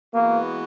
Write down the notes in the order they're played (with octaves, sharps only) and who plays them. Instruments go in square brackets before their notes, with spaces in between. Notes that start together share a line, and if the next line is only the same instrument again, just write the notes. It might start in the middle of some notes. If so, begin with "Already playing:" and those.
[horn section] E3 G#3 B3 F#4 [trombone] A#3